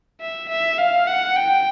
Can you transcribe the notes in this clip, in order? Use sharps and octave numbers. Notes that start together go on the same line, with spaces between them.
E5
E5
F5
F#5
G5